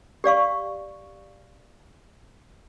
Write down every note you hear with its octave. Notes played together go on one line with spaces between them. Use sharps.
G4 D5 F5 C#6